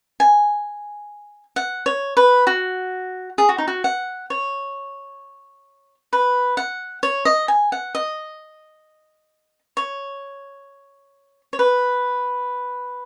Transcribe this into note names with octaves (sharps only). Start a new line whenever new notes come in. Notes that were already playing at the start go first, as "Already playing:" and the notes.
G#5
F#5
C#5
B4
F#4
G#4
F#4
D#4
F#4
F#5
C#5
B4
F#5
C#5
D#5
G#5
F#5
D#5
C#5
C#5
B4